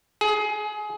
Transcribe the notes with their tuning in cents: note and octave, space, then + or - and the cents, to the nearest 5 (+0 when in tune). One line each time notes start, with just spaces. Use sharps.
G#4 +25